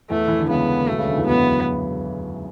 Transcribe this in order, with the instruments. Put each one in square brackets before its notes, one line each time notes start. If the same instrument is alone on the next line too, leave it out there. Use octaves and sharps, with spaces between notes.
[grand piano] E2 E3 [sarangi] A3
[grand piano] E3
D3
[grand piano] C#2 C#3 [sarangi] B3
[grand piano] B1 B2 [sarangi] A3
[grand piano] C#2 C#3
D2 D3
E2 E3
[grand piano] F#2 F#3 [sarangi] B3